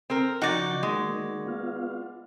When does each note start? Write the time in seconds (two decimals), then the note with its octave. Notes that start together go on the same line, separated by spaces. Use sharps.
0.10 C4 A#4
0.42 C#3 F3 D#4 F#4 D5 G6
0.83 D#3 G#3 A#3
1.47 B3 F4 F5